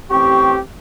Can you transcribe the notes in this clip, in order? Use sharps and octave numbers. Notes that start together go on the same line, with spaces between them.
A1 C4 G4 C#6